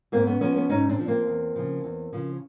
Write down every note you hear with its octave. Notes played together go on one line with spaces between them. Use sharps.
G#2 A#3 C4
B3 C#4
F3 B3 C#4
B3 C#4
G#2 C#4 D#4
C4 D4
F3
A#3 C4
E2
C#3 F3
E2
C#3 F3